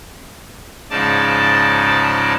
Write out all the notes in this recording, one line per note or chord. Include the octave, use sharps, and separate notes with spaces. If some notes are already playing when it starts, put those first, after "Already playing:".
G#2 C#3 F3 D#4 D5 A5